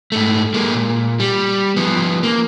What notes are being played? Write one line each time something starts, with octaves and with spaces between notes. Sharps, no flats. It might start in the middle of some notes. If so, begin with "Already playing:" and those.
G#2 A3
G#3 A#3
A#2
G3
F3 B3
A#3